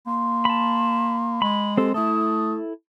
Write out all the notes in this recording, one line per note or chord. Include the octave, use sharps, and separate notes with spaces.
A#3 C6
A5 B5
G#3 B5
C4 G4 A4
A3 E4 A4 D#6